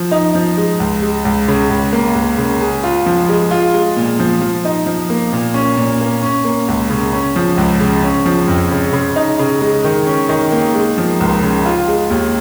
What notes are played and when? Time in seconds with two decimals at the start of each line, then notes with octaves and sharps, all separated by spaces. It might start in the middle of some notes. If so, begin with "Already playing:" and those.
Already playing: F3
0.11 D#4
0.35 F3
0.57 G#3
0.80 C#2
1.02 G#3
1.25 C#2
1.48 C#3
1.70 C#2
1.93 A#3
2.15 C#2
2.38 C#3
2.61 G#4
2.83 F4
3.06 F3
3.29 G#3
3.51 F4
3.74 G#3
3.96 A#2
4.19 F3
4.41 F3
4.65 D#4
4.86 F3
5.10 A#3
5.33 A#2
5.54 C#4
5.77 A#2
6.00 A#3
6.22 C#4
6.44 A#3
6.68 C#2
6.90 C#3
7.13 C#4
7.36 F3
7.57 C#2
7.80 C#3
8.03 C#4
8.26 F3
8.48 F2
8.71 C#3
8.93 C#3
9.16 D#4
9.39 C#3
9.61 G#3
9.84 D#3
10.06 C#4
10.29 D#3
10.52 A#3
10.75 G#3
10.98 F3
11.20 C#2
11.42 C#3
11.65 F4
11.88 G#3
12.10 D#2